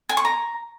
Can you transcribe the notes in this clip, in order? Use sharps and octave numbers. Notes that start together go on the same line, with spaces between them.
G#5
C#6
A#5